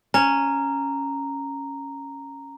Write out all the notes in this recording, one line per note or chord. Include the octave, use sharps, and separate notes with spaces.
C#4 A#5